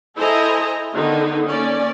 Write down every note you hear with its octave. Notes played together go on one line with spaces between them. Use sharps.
E4 A4 C5 D#5 G#5 A#5
D3 D#3 B3 D#4
A#3 C#4 D5